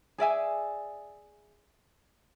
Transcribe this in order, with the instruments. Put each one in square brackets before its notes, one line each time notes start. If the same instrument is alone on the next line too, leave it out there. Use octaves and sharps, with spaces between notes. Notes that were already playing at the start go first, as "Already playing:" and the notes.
[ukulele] G#4 D5 E5 G#5